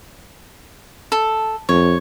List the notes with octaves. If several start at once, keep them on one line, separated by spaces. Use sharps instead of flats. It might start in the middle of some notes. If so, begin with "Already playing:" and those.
A4
F2 C#5